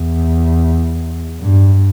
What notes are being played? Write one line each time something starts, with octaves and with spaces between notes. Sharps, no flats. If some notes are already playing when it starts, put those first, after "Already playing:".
Already playing: E2
G2